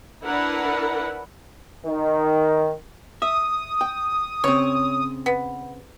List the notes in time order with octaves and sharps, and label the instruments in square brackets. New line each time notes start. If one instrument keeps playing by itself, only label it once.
[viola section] D4 E4 A#4 B4 F#5
[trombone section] D#3
[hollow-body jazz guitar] E5 [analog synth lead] D#6
[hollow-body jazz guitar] G5
[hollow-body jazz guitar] C#3 C4 [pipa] C#5
[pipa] B3